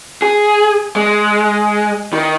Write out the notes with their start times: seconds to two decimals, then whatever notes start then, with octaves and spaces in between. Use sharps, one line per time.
0.22 G#4
0.96 G#3
2.13 D#3